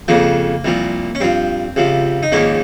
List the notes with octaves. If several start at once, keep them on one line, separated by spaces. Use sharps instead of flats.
F2 C#3 F3 A#3
C2 A#2 F3
C#4
G2 F3 C4
C#2 C3 F3
D#4
A#1 G#2 D#3 A#3 C#4